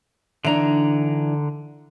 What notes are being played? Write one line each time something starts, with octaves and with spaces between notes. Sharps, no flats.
D3 E3 D4 D#4 A#5